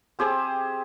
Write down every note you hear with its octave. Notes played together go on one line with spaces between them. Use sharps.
C4 G4 G#4 C5